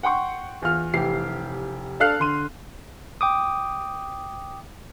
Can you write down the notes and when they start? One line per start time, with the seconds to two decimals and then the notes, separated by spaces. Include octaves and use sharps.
0.03 F#5 G5 C6 C#6
0.62 E2 F4 F6
0.93 F1 E3 G4 C7
2.00 D4 A4 F5 F6 F#6 C7
2.20 D3 C6 D#7
3.21 G5 D6 D#6